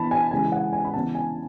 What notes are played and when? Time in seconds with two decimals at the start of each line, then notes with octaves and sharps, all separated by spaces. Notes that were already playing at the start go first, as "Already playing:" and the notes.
Already playing: E3 B3 A5 B5
0.11 G#5
0.31 C#3 E3 G#3 G#5
0.52 F#5
0.73 G#5
0.84 B5
0.94 C#3 E3 B3 A5
1.15 G#5